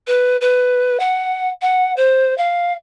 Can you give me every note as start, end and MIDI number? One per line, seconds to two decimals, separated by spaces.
0.07 0.37 71
0.41 0.98 71
1.00 1.49 78
1.62 1.93 78
1.97 2.36 72
2.38 2.73 77